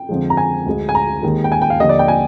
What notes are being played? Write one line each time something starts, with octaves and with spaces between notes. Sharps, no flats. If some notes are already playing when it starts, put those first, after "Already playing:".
Already playing: G5
F2 D3 F3 G#3
A#5
G#5
D2 D3 G#3
G#5
A#5
D#2 D#3 G#3
G5
G#5
G5
F5
D#2 D3 F3 D#5
D5
G5
G#5